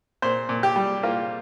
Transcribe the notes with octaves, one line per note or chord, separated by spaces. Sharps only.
A#2 C5
A#2
G4
G3
A#3 F4